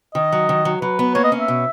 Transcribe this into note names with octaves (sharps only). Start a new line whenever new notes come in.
D#3 D#5
F#3
D#3
F#3
F#3 B4
B3
A#3 C#5
D#5
C#4
E5
B2